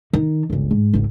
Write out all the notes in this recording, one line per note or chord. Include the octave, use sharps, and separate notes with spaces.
D#3
G1 C#2
G#2
G#1 C#2